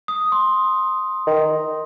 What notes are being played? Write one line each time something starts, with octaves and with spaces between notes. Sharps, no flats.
D#6
C6
D#3